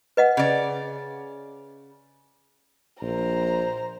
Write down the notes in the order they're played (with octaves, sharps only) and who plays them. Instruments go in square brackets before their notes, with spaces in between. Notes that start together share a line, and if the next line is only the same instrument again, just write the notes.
[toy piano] B4 D#5 F#5
[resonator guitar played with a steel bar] C#3 D5
[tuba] A#1 [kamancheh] C5 A#5